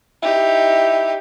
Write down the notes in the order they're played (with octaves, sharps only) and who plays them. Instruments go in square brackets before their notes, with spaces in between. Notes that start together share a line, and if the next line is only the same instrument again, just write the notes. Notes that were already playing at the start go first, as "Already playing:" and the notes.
[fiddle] D#4 G4 [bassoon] E4